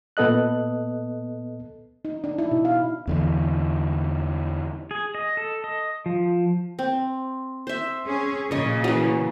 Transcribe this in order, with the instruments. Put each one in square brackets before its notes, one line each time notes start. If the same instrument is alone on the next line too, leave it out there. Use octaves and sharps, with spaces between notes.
[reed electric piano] A#2 B3 A4 D#5 F#6
[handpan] D#4
D4
E4
B2
F5
[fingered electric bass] E2 D3 E3
[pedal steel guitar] G#4
D#5
A4
D#5
F3
[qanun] C4
C5 E5
[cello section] C#4 G#4
[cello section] A#2 C#3 [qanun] C#5 D#5
[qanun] E3 F#3